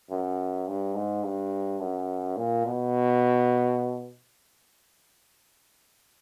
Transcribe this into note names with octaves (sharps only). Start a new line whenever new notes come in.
F#2
G2
G#2
G2
F#2
A#2
B2